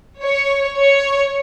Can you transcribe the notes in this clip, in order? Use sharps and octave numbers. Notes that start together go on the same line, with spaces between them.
C#5
C#5